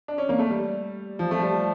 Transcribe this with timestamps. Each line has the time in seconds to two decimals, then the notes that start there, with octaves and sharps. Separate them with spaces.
0.08 D4
0.18 C#4
0.29 A#3
0.39 A3
0.50 G3
1.19 F3
1.31 A3
1.42 G3